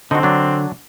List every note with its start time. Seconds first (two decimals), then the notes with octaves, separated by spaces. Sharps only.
0.11 D3 C4 D#4 F#4
0.23 F#3 D4